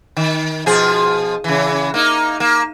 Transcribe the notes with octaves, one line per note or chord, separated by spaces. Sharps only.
D#3
B2 F3 G#4
C#3 E3
A#3 D#4
A#3